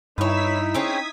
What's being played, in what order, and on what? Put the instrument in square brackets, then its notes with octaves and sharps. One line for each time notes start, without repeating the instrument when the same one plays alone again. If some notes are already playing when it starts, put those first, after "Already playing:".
[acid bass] G2 [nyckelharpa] D#4 [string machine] E4 E6 B6 [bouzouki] B4 C#5
[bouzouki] C4 C#4 G#4 [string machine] D#6 G#6 B6